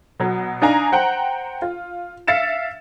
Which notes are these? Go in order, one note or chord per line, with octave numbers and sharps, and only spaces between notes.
B2 F#3
D4 D#4 F5 G#5 A#5
C5 F#5 G5 A#5
F4
E5 F5 A6 C#7 E7